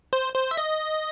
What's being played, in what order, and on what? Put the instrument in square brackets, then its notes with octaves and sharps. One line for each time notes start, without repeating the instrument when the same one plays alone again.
[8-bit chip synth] C5
C5
E5
D#5